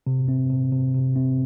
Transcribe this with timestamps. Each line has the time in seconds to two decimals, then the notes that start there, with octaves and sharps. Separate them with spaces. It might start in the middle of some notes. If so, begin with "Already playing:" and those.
0.07 C3
0.28 C4
0.51 C3
0.72 C3
0.94 C3
1.16 C4